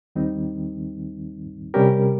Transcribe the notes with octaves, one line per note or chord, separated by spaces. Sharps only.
D#2 D#3 G3 C4 D#4
C3 G3 C#4 G4 A#4